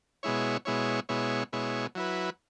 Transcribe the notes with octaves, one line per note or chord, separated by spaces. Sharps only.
B2 G#3 E4 C#5
B2 G#3 E4 C#5
B2 G#3 E4 C#5
B2 G#3 E4 C#5
F#3 E4 B4